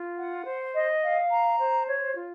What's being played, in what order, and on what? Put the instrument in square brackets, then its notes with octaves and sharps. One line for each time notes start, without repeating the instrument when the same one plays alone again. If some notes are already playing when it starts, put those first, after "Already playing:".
Already playing: [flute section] F4
F#5
C5
D#5
F5
A#5
C5
C#5
F4